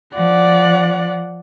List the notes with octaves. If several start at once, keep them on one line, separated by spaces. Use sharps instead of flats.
F3 D5 F#5